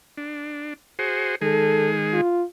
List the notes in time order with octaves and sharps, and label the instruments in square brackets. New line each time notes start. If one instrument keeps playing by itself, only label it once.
[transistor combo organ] D4
F#4 G#4 C5
[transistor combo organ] D#3 G#3 G#4 [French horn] A4
[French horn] F4